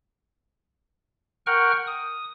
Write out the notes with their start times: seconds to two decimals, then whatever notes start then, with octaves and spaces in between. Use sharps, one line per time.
1.47 A#4 F#5 G5 C#6 F6
1.87 D#6